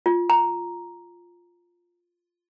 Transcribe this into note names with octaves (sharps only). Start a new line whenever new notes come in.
F4
A#5